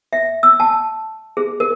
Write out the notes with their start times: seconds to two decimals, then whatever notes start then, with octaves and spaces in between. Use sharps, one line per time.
0.13 E5
0.43 E6
0.60 A5
1.37 G#4
1.60 A#4